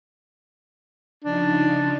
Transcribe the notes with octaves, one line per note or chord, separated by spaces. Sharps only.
C#3 F3 D4 D#4